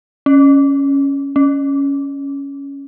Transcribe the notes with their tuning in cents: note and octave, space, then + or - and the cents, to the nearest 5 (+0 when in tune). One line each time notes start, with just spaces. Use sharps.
C#4 +0
C#4 +5